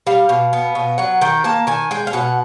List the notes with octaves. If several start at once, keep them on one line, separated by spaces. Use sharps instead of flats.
G3 F5
B2
B3
B2
F#3 F#5
D#3 G5
A#3 A5
D#3 G#5
G#3 G5
F5
B2 F#5